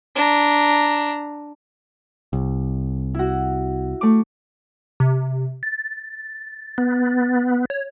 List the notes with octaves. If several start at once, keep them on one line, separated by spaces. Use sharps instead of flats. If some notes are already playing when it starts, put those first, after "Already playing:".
D4 A#5
C2
E4 F#4
A3 D6
C3
A6
B3
C#5